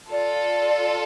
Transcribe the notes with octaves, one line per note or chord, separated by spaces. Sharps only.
F4 A4 D5